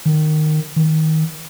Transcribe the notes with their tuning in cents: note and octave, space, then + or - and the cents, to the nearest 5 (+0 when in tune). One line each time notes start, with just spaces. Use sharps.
D#3 -15
D#3 +20